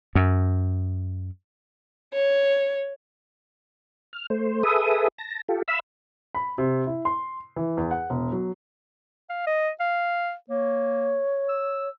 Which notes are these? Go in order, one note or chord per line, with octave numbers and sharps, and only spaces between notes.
F#2
C#5
F6
A3 C5
G#4 A4 B4 E5 D#6
A5 A#6
F4 G4 A4
E5 F5 B5 E6
B5
C3
E4
C6
E3
E2
F#5
E1
F#3
F5
D#5
F5
A#3 C#5
E6